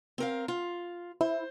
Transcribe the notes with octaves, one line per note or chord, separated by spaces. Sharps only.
C4 A#4 F5
F4
E4 C5